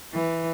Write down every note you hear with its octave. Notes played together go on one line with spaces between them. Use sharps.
E3